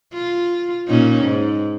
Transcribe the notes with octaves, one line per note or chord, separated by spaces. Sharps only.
F4
A#2 C#4 D#4
G#2